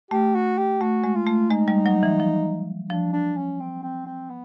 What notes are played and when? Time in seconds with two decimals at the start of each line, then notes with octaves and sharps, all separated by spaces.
0.11 A3 G4
0.35 F#4
0.58 G4
0.81 A3 F#4
1.04 G#3
1.15 F4
1.27 A3
1.50 G#3 D#4
1.68 G3
1.86 F#3
2.03 E3
2.20 F3
2.90 F3 D4
3.13 D4
3.36 C#4
3.60 C4
3.83 C4
4.06 C4
4.30 B3